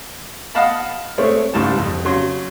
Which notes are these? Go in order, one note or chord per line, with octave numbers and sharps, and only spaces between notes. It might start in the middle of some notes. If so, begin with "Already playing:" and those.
D#5 F5 F#5 A5 B5
G#3 A3 C4 C#5
C2 G#2 C#3 G3 A5
F2
C#3 F#3 C6